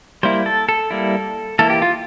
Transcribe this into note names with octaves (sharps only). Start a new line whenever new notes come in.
G3 A#3 E4 C5
A4
A4
G3 A#3 E4
E3 A#3 E4 A4
G4
F4